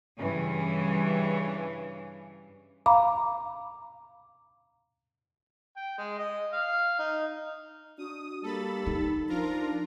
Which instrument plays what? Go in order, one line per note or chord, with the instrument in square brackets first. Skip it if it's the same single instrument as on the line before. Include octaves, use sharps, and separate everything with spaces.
[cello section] G2 C#3 E3
[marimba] F5 A#5 B5 D6
[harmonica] G5
G#3
D#5
F5
D#4
[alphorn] D4 [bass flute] F#4 [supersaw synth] D#6
[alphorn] G3 [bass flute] A#3 [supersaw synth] A4 B5 A6
[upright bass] D#4
[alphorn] F3 [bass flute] D4 [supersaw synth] F4 A#4 A#5